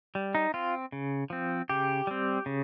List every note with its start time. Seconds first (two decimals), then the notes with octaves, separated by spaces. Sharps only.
0.15 G3
0.35 D#4
0.54 C4 F4
0.92 C#3
1.30 F3 C4
1.69 C#3 G4
2.07 G3 C4
2.46 C#3